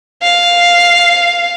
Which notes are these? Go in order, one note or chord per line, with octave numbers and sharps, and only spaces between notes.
F5